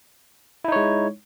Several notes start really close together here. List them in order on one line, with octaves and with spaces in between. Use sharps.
E4 D#4 C#5 G#3